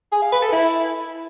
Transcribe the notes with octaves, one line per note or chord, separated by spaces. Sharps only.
G#4
F5
B4
A4
E4